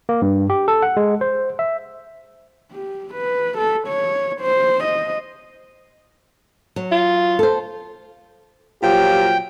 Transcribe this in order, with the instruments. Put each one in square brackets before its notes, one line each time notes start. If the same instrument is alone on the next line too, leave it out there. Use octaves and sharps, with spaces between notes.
[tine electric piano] A#3
G2
G4
A4
F#5
G#3
C5
E5
[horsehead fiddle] G4
B4
A4
C#5
C5
D#5
[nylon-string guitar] F#3
[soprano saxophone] F4
[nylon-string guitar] A4 C5
[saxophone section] A#2 F3 F#3 [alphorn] G4 [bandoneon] G5